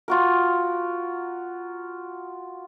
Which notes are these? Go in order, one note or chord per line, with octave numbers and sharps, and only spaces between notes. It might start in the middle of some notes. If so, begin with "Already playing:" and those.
F4 F#4 A#4